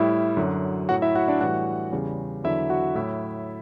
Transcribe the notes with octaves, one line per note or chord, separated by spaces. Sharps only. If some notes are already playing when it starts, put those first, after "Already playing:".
Already playing: A2 G3 E4 E5
F#2 D3 F#3
A2 F#3 F#4 F#5
E4 E5
F#4 F#5
D4 D5
A2 E3 G3 F#4 F#5
E2 C#3 G3
E2 D3 F#3 E4 E5
F#4 F#5
A2 F#3 E4 E5